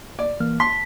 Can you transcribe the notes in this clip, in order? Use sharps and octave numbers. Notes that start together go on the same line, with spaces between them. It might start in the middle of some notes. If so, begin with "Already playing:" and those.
D5
E3 A#3 F6
A5 C6 B6